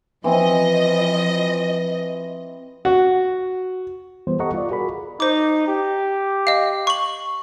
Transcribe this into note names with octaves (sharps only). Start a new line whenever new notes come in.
E3 F3 C4 D#5
F#4
E3 G3 B3 C5
G4 A4 D#5 F#5 A#5 C#6
F4 D5
F#4 G#4 A#4 B5
D#4 C5 D6
G4
D#5 F5
C#6 F#7